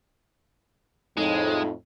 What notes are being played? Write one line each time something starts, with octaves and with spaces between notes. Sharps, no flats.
F2 A2 G#3 D#4